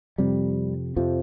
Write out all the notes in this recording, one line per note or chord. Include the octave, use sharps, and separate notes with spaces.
F2 C3 G3
F2 C3 F3